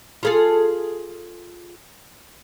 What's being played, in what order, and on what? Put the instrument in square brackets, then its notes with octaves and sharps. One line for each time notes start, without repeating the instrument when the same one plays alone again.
[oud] F4 G#4 A4